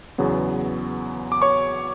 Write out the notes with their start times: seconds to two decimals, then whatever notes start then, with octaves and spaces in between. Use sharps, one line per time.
0.18 E2 C#3 F#3 B3
1.32 D6
1.42 C#5 C#6